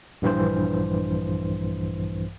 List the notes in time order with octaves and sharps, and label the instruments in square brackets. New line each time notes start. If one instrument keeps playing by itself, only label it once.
[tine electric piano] A#1 G2 E3 C5